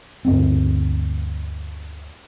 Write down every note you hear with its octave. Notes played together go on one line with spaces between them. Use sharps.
D2 G2 C4